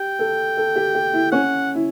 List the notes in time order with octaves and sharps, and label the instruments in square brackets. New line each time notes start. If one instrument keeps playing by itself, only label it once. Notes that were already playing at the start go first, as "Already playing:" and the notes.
Already playing: [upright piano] G4 [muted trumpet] G5
[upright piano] A4
A4
G4
G4
E4
[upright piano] C#4 [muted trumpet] F#5
[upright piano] E4